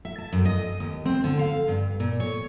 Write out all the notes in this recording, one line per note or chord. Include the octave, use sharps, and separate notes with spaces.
E5
A5
F#2
D#5
D#2
C4
D3
F5
G2
A#2
C#5